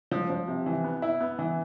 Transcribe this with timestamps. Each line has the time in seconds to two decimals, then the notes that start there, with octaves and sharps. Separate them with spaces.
0.11 F3
0.30 F3
0.48 C3
0.66 E3
0.84 B3
1.02 E4
1.21 B3
1.39 E3